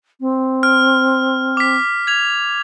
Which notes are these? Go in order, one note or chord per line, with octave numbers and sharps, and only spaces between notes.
C4
F6
D6 B6
G#6 F7